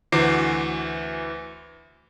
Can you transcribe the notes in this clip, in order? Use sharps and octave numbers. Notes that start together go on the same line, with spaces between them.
D2 E3 F#4 C5 D6 C7